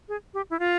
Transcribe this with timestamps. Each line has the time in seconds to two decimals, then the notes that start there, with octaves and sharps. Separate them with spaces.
0.09 G#4
0.34 G4
0.50 E4
0.59 F4